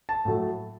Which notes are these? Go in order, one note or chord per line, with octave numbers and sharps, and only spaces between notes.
A5
A2 F#3 A3